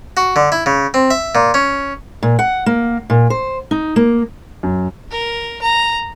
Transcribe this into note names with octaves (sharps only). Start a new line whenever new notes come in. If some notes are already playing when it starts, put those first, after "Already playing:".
F#4
D3
E4
C#3
C4
E5
A#2
C#4
A#2
F#5
A#3
A#2
C5
D#4
A#3
F#2
A#4
A#5